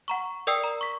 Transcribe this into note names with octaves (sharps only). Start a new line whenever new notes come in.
F#5 A#5 C#6
A#4 D5 G5 D#6 E6 C7
A#5
C#6 B6